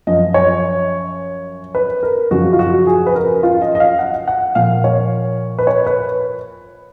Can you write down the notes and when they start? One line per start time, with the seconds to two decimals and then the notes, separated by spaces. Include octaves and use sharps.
0.07 F#2 F3 D#5
0.34 C#5
1.75 B4
2.03 A#4
2.31 F#2 C#3 F3 F#4
2.53 F4
2.59 F#4
2.87 G#4
3.06 B4
3.15 A#4
3.43 F4
3.62 D#5
3.75 D#5
3.80 F5
3.99 F#5
4.28 F#5
4.55 A#2 F3 F5
4.84 C#5
5.59 B4
5.67 C#5
5.87 B4